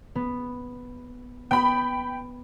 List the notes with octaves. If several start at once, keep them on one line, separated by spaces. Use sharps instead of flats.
B3
B3 G5 B5